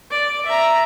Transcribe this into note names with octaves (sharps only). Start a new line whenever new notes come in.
D5
E5 A#5